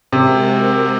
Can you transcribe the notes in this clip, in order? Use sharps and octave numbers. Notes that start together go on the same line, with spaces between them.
C3 G#3 C4 F#4 A#4